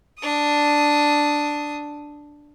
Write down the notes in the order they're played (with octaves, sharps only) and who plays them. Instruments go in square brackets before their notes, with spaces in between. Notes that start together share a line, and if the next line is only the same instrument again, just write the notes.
[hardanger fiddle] D4 D#6